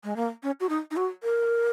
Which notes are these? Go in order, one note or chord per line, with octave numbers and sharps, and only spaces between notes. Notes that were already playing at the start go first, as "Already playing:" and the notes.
G#3
A#3
C#4
F#4
D#4
D#4
F#4
A#4